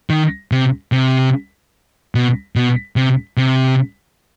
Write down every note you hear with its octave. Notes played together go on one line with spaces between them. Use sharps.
D#3
C3
C3
B2
B2
C3
C3